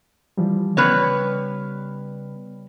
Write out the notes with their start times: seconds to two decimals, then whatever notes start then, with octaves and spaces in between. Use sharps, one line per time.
0.37 E3 F3 G3
0.77 C#3 G3 B3 B4 C#5